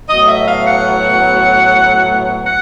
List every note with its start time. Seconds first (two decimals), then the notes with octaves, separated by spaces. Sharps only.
0.08 A2 F#3 B3 D#5
0.27 E5
0.48 F5
0.67 F#5
2.44 F#5